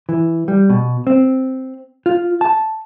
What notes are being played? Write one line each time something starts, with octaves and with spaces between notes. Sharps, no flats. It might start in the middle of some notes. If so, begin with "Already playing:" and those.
E3
G3
B2
C4
F4
A5